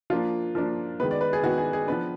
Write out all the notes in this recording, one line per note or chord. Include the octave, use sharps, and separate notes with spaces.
F3 A#3 D4 F4
F3 A#3 D4
D#3 G#3 B3 B4
D5
B4
G#4
D#3 G#3 B3 F#4
G#4
G#4
F3 B3 D4 B4